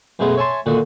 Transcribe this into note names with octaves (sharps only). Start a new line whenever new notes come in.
F#2 B2 G#3 A3 B3
C#5 E5 G#5 A5 C6
A#2 D3 D#3 F#4